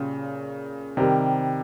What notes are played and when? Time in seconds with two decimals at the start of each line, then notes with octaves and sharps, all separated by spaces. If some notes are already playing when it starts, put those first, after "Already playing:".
Already playing: A#2 C#3 G3 C#4 F4
0.97 C3 D#3 G3 C4 G4 A#4